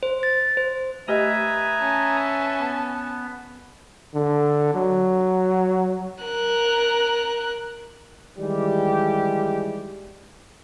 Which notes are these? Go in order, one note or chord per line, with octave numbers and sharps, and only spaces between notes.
C5
A6
C5
A3 G4 B4 D#5 E5 G#5 A#5 D#6
C#4 A5
B3
D3
F#3
A#4 F#6
D#3 E3 G3 G#3 G4